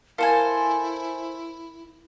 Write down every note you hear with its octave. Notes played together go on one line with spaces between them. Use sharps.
E4 A4 A#4 C5 F5 G#5